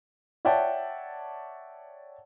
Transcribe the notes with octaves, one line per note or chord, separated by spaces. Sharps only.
C#5 D5 E5 F#5 G5 A5